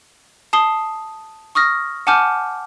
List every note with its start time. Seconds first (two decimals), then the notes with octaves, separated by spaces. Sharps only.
0.53 A5 D#6 C7 G7
1.55 C#6 D#6 F6 A#6
2.07 F#5 G#5 A5 D6 F6 G6